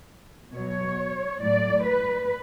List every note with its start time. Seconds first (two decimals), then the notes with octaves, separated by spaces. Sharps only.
0.53 B2 F#3 C#5
1.40 A2 F#3 D5
1.84 B4